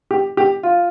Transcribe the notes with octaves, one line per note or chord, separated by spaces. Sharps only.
G4
G4
F4